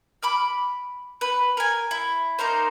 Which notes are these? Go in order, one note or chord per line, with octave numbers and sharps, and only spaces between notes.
B5 D6 F6
B4
A#4 G#5
E4
A#3 D#4 A#4 C5